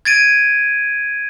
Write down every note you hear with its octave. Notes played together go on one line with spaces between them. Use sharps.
G#6 A6 D7 D#7